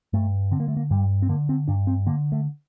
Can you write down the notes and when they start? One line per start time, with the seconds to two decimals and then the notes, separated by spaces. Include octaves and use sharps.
0.13 G2 A3
0.51 D3 C4
0.60 A#3
0.68 A3
0.77 A#3
0.91 G2 G3
1.22 C4
1.29 D3 A#3
1.49 C4
1.68 G2 D4
1.87 C4
2.06 D3 A#3
2.32 A3